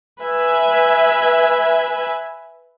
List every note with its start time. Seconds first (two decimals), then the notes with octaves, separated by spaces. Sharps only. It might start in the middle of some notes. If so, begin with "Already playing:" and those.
0.23 B4 E5 G#5